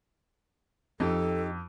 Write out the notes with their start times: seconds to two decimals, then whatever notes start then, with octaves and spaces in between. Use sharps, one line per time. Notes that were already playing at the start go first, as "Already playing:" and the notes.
1.00 F2 D#4 G4 A4